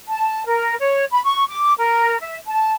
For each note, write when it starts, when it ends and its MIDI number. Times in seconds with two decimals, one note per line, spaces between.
0.08 0.43 81
0.46 0.75 70
0.80 1.05 73
1.11 1.23 83
1.24 1.44 85
1.49 1.74 86
1.79 2.18 70
2.20 2.37 76
2.47 2.74 81